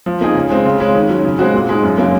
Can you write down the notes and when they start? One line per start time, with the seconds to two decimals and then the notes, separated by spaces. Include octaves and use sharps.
0.06 F3
0.21 A#3 D#4 G#4
0.35 C#3
0.50 G#3 C4
0.65 C#3
0.80 G#3 C#4
0.95 D#3
1.09 F#3 C#4
1.24 C#3
1.39 G#3 C4 F#4
1.54 A#2
1.69 G#3 D#4
1.83 F#2
1.98 C#3 F#3 A#3